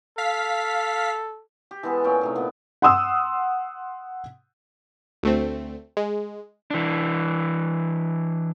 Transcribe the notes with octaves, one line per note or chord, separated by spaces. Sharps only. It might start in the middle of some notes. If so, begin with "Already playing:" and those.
A4 F5 B6
G4
E3 G#3 B3 A4
A#2 C#4 G5
A2 C3 D#4
A#2 B3
F#5 C6 D#6 E6
D2 A3 C4
G#3
E3 D4